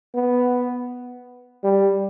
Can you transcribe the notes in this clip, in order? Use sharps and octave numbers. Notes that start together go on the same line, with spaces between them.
B3
G3